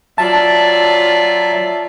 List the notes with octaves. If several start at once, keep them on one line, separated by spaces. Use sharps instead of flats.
F#3 F4 D5 E5 A5